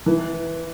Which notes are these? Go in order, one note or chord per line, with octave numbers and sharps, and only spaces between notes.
E3